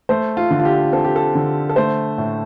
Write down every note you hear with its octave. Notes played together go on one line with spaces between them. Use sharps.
A3 C5
F4
D3
F4
G4
C4 A4
G4
A4
D3
A4
A3 C5
A2